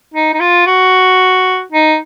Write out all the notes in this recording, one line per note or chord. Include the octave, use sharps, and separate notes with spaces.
D#4
D#4
F4
F#4
D#4